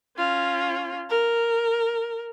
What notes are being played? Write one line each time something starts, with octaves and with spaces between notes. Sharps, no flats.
C#4 F4
A#4